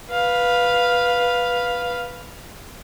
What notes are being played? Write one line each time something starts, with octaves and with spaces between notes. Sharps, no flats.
B4 F5